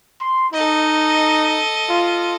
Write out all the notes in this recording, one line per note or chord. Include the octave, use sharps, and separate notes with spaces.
C6
D#4 A4 D#5
F4